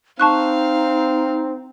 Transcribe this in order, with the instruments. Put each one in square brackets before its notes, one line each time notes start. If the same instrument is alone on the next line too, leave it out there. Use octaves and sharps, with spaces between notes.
[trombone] C4 [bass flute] D#4 [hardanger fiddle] F5 [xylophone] A5 C#6 F#6